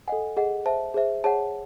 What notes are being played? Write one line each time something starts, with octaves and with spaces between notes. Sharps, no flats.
A4 D#5 F#5 G#5
G#4 D#5 F#5
C5 E5 A5
G#4 C5 E5
G#4 C#5 F#5 A5